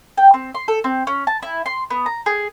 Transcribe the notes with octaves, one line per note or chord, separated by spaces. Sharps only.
G5
C4
C6
A4
C4
C#4
A5
E4
C6
B3
A#5
G#4